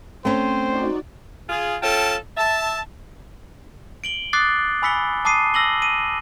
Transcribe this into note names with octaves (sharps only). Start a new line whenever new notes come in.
A3 C4 C#4 C5
D#4 F#4 D5
F4 G#4
C#4 F4 A4 G5 A5
E5 A5
D7 F#7 G7
D6 D#6 F#6 A6 C7
G#5 B5 E6 B6 C#7 G7
A5 D6 D#6 C7 D#7
E6 A#6 F#7 G7
D#7